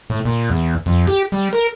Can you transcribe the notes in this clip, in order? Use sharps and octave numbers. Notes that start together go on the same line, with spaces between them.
A2
A#2
E2
F2
G4
G3
A#4